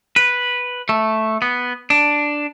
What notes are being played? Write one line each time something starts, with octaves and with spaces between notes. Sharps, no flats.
B4
A3
B3
D4